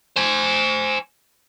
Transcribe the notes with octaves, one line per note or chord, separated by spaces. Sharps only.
C5 G#5